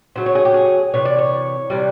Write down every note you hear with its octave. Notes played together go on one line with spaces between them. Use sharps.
C#3 F#3 A3 C5
C#5
G#4
G4
G#4
C3 E3 C#5
D5
C#5
C3 E3 G3